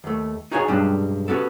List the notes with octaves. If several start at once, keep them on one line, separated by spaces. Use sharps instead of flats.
D#2 A3
D#4 F#4 G#4 C#5 G5 G#5
B1 G2 G3 G#3 C#4 D4
B3 C#4 D4 F#4 G4 A4